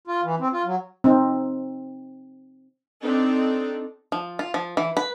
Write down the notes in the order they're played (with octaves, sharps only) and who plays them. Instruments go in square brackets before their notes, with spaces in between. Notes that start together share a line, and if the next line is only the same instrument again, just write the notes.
[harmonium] F4
E3
C4
F4
F#3
[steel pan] C4 D#4
[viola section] C4 D4 D#4 A4
[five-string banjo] F3
F4
F3
E3
B4